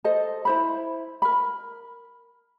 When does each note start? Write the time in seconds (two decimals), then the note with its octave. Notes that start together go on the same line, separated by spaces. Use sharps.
0.04 A4 C5 D#5
0.45 E4 C5 B5
1.22 A#4 B5